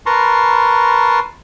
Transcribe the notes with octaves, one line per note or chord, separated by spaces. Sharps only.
A#4 B4 A5 A#5 C6 C#6